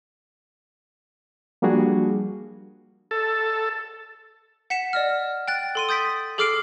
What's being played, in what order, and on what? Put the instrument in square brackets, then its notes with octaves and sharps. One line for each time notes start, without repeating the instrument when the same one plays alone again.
[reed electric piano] F3 G3 A#3 D4 F#4 G#4
[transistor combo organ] A4
[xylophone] F#5 B6 C#7 E7
D5 D#5 F6
G5 F#6 A6
A4 C6 D#7
D#6 G6 A6 B6 D7
G#4 A4 D6 F6 C7 D7